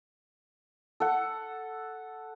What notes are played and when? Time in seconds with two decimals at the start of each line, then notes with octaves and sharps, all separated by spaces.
1.00 A4 F#5